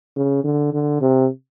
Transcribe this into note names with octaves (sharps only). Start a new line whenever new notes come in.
C#3
D3
D3
C3